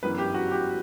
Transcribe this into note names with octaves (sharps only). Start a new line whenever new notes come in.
G1 F#2 E3 B4
G4
F#4
G4